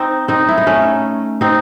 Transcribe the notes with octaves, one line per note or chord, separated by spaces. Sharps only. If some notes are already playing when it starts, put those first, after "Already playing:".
Already playing: C4 D#4
C4 D#4
E4
D#4
A3 C#4
C4 D#4